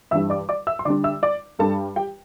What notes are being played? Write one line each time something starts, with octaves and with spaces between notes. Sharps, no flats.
G2 E3 G3 D4 E5 E6
D5 D6
D5 D6
E5 E6
C6
D3 G3 D4 D5 D6
E5 E6
D5 D6
G2 G3 D4 A4 A5
G4 G5